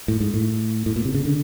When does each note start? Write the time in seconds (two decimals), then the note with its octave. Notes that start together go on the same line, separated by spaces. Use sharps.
0.08 A2
0.20 G#2
0.34 A2
0.86 A2
0.96 A#2
1.05 C3
1.15 C#3
1.25 D3